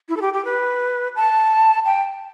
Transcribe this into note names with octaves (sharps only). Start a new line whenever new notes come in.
E4
A4
G4
G4
B4
A5
G5